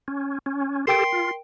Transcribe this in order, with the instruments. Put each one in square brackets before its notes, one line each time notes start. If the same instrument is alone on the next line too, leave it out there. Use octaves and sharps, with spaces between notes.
[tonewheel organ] C#4
C#4
[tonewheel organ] G4 A4 [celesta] A#4 G5 D7 [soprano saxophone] C6
[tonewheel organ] F4